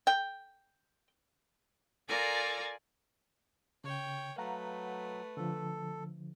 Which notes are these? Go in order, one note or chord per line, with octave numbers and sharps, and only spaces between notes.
G5
F4 A4 A#4 D5 G#5 A#5
C#3 C#5 G5
F#3 A3 B4 F5 F#5 A#5
D3 F3 A4